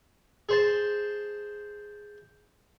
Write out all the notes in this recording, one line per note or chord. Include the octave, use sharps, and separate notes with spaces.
G#4 C5 A5